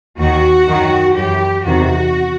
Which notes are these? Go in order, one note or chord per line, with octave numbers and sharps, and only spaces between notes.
D#2 D#3 F#4
F#2 D#3
F#2 E3 G4
E2 C3 D#3 F#4